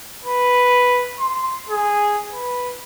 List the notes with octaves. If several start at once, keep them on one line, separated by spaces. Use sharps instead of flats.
B4
C6
G#4
B4